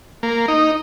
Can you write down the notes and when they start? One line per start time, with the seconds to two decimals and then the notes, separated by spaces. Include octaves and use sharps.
0.23 A#3
0.48 D#4